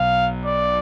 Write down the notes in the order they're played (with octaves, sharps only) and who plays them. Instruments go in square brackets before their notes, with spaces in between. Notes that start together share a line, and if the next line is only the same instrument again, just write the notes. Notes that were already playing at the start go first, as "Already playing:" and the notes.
Already playing: [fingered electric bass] B1 B2 [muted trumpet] F5
[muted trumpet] D5